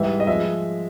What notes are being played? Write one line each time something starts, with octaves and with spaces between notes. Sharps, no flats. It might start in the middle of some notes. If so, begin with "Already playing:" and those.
Already playing: G#2 E3 G3 E5
D#5
F3 G#3 E5